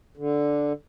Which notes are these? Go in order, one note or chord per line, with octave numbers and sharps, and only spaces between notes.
D3